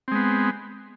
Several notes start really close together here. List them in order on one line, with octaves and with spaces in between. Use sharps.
C4 G#3 B3